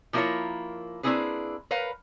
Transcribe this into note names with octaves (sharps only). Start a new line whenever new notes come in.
F3 A#3 E4 F4 A#4 C#5
A#3 C4 D4 E4 G#4 B4
A#4 B4 C#5 F5